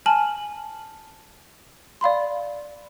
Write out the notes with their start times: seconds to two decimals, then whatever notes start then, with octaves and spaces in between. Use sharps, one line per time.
0.06 G#5 A5 F6 F#7
2.01 D5 F5 B5 C6